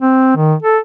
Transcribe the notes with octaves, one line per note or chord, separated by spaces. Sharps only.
C4
D#3
A4